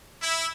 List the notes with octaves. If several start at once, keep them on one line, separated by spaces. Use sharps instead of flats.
E4